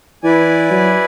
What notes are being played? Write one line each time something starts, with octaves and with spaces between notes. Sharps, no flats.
E3 E4 B4 D5 G#5
F#3